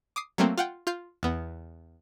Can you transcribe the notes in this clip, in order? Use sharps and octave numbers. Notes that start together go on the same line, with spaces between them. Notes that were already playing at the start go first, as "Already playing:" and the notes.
D6 D#6 C7
F#3 A3 A#3 C4
F4 F#5 G5
F4 G6 C7
E2 B3